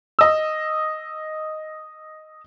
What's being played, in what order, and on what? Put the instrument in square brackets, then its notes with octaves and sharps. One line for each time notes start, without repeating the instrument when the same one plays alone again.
[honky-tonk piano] D#5 E6